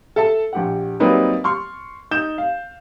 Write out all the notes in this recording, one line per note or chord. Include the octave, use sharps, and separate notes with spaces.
A4 E5 A5
A#1 G4 F#5
F#3 G3 A#3 C4 D#4 B4
C6 C#6 F6
D#4 G6 E7
F5